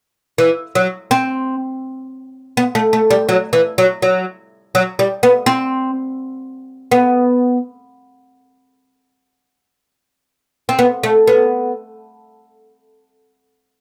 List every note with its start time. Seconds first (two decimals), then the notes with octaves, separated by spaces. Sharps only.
0.38 E3
0.75 F#3
1.11 C4
2.57 B3
2.75 A3
2.93 A3
3.10 G3
3.29 F#3
3.53 E3
3.78 F#3
4.02 F#3
4.75 F#3
4.99 G3
5.23 B3
5.46 C4
6.92 B3
10.69 C4
10.79 B3
11.03 A3
11.27 B3